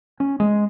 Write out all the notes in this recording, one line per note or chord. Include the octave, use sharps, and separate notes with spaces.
C#4
G#3